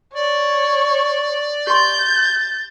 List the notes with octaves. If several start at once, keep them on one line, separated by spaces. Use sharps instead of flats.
C#5 D5
G4 C6 G6 A6